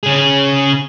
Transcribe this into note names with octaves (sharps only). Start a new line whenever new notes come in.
C#3 G#4